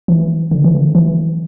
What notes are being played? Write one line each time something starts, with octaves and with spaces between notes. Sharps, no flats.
E3
D3
E3
D3
E3